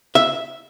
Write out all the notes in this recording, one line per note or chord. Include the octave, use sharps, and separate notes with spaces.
E5